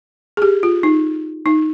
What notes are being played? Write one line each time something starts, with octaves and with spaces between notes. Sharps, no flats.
G#4
G4
F4
D#4
D#4